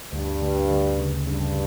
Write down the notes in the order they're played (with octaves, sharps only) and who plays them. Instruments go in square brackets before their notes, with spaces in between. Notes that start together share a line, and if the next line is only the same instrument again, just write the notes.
[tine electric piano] D2 [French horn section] G2
[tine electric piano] D2
D2
C#3
[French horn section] G2 [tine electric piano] C#3